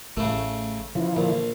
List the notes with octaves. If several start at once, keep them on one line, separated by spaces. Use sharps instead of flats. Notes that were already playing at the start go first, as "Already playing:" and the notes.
A1 C#3 A3
C#3 E3 F3
A#1 D3